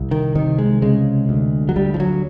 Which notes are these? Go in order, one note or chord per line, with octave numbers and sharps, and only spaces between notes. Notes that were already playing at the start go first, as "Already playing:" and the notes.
Already playing: C2
D#3
C3 D#3
G#3
C#3 G#3
D2
F#3
D2 G3
F3
F#3